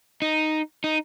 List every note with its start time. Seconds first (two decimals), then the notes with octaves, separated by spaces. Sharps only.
0.22 D#4
0.84 D#4